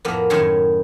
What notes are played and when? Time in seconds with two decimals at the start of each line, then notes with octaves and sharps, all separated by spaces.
0.05 F2 A2 A#3 B3
0.30 F#2 A2 D#3 E4 C#5 C6